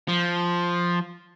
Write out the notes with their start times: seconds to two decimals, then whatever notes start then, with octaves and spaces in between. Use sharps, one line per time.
0.08 F3